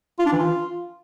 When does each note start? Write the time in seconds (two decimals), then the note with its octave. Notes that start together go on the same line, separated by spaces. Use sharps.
0.19 F4
0.26 D4
0.33 E3
0.39 F4